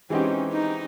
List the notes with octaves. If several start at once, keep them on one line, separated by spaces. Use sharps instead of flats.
E3 G#3 C4 C#4 D#4 G4
D#4